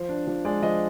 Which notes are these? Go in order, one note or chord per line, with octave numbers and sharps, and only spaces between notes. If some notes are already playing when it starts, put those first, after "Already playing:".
Already playing: F3 C5
D4
F3
G#3 D5
F3 D#5